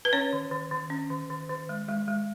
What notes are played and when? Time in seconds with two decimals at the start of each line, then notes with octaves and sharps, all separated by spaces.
0.05 B4
0.13 C#4 C#5
0.33 D#3
0.51 D#3
0.71 D#3
0.90 C#4
1.10 D#3
1.30 D#3
1.50 D#3
1.69 G#3
1.88 G#3
2.08 G#3